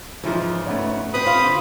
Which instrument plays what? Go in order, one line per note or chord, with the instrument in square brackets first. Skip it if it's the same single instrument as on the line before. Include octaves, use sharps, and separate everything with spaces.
[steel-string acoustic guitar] G#2 C#3 [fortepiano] E3 F3
[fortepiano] A3 B3 C#4
[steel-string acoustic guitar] C4 B4 [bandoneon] B5 D#6
[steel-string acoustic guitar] C4 F4 G4
[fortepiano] D3